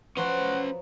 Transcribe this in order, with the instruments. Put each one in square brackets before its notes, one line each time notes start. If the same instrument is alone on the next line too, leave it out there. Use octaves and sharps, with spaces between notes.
[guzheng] F3 F#3 C#5 [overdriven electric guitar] C#4 C6 [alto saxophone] B4 [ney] F#5